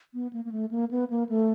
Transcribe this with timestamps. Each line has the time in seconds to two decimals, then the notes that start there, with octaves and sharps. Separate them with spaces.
0.14 B3
0.33 A#3
0.45 A#3
0.52 A3
0.71 A#3
0.91 B3
1.10 A#3
1.29 A3